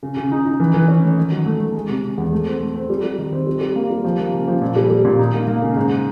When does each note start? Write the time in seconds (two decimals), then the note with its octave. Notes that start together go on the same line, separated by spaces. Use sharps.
0.03 C#3
0.17 C#3
0.32 D#4
0.46 D#4
0.60 E3
0.74 E3
0.88 C#4
1.03 A3
1.17 D#3
1.32 F#3
1.46 A3
1.60 A3
1.75 G#3
1.89 C3
2.03 C3
2.18 E2
2.32 A3
2.47 C4
2.61 A3
2.75 C4
2.90 G3
3.04 G3
3.18 D#3
3.33 C4
3.47 G3
3.61 G3
3.76 A#3
3.90 G3
4.04 F3
4.19 A#3
4.33 C#3
4.48 F3
4.62 A#2
4.76 G3
4.90 G3
5.05 A#2
5.19 D#4
5.34 A#3
5.48 A#3
5.62 C#3
5.76 G#2